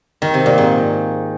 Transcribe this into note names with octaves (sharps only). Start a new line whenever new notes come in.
D#3
C3
A#2
G#2